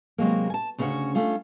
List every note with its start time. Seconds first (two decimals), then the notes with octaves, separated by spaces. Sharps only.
0.18 C3 F#3 G#3 A#3
0.50 G#5 A5
0.78 D2 C#3 C#4 D#4 F#4 C#5
1.15 A3 C#4 D4 F4